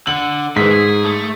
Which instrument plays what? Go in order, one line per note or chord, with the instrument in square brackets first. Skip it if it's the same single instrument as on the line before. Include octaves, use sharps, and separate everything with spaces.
[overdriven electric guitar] D3 [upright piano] F#7
[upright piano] G#2 B6 [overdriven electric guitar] D#3 E3
[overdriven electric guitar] G#4
A3